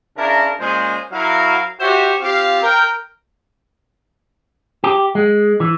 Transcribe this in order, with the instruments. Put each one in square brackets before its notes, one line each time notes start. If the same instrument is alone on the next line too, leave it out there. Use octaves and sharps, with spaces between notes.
[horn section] C#3 D4 E4 A#4
A#2 G#3 C#4 G#4 C5
F#3 E4 F#4 A#4 F5
F#4 G4 C5 C#5 E5
C4 F4 G4 F5
A#4 G5
[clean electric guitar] G4
G#3
E3